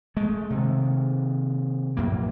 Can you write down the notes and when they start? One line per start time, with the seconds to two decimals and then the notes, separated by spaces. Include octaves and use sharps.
0.17 G#3 A3
0.50 C3 D#3
1.97 A#1 F#2 A#3